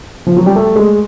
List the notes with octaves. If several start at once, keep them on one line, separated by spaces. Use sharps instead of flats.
F3
F#3
G3
A3
G#3